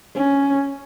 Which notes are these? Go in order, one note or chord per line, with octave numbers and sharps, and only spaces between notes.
C#4